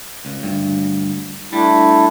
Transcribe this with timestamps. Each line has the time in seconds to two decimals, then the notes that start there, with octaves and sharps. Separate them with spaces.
0.25 C#2
0.43 D2 G2
1.53 G3 A3 D4 E4